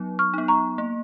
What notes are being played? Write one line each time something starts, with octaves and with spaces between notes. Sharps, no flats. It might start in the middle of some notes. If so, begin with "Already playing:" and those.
Already playing: F#3 B3 D#4
C#6 F6
B3 D#4
A#5 C#6
A#3